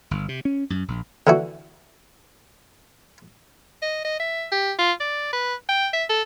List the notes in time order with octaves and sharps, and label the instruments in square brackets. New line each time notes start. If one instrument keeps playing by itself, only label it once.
[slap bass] G1
C3
C#4
F#2
A#1
[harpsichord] D3 E3 F#4
[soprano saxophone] D#5
D#5
E5
G4
F4
D5
B4
G5
E5
A4